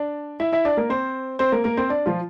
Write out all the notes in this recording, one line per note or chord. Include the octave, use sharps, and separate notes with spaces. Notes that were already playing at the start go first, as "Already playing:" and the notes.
Already playing: D4 D5
E4 E5
E4 E5
D4 D5
A#3 A#4
C4 C5
C4 C5
A#3 A#4
A#3 A#4
C4 C5
D4 D5
F3 F4